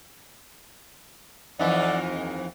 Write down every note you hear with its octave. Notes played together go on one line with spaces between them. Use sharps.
F2 E3 D#4 D5 E5 F#5
D#2